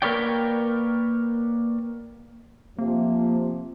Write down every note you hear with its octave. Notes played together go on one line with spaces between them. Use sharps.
A#3 A#4 B4 C#5 D5 G5
C3 F3 A#3